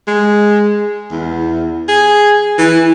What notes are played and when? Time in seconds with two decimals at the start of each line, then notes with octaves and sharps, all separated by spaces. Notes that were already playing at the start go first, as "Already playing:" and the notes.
0.07 G#3
1.11 E2
1.89 G#4
2.58 E3